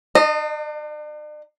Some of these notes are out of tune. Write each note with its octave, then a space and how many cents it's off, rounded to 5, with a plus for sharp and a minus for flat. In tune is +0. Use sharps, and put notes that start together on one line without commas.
D4 +45 D#5 -20